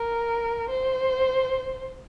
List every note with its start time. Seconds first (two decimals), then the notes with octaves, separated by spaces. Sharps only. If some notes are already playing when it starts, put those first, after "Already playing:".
Already playing: A#4
0.69 C5